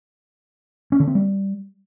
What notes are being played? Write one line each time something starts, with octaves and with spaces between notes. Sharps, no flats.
C#4
D3
C4
G3